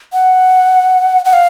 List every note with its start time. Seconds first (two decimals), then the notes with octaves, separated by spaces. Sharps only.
0.13 F#5
1.25 F#5
1.33 F5